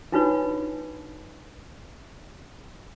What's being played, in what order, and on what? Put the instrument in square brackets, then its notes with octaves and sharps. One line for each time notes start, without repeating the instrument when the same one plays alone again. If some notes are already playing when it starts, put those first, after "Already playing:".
[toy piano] D4 D#4 F4 F#4 B4 C#5